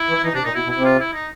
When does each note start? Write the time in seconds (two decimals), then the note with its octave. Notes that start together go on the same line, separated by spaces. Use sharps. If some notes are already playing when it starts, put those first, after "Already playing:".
Already playing: E4
0.09 E3
0.24 E3 D#4
0.34 C3 D4
0.44 A#2 D#4
0.54 B2 E4
0.65 B2
0.70 E4
0.75 C3
0.85 F4
1.00 E4
1.13 D#4